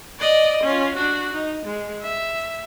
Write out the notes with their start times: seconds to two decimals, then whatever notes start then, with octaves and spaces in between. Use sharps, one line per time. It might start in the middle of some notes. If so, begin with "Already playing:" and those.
0.19 D5 D#5
0.63 C#4 F4
0.94 D4 F#4
1.33 D#4
1.65 G#3
2.02 E5